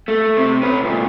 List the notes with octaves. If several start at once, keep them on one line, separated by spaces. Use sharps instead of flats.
A3
C3
C#4 B4
C#2 A#2